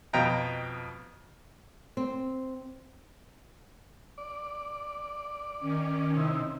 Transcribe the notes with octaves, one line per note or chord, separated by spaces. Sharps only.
F2 B2 D#5 G5 A#5
C4
D5
D#3 C#4
C3 D#4 E4